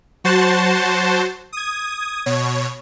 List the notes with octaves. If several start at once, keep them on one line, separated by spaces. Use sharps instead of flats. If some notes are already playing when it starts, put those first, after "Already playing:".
F#3 F#4 C5 A5
D#6 G#6
B2 C#5